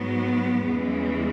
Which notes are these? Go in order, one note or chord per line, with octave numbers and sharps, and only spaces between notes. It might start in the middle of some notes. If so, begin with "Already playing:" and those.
Already playing: G#2 F#3 B3
E2 C#3 E3 G#3